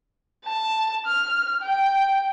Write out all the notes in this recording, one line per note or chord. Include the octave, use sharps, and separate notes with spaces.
A5
F6
G5